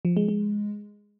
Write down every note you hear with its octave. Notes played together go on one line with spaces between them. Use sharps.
F3
G#3
G#3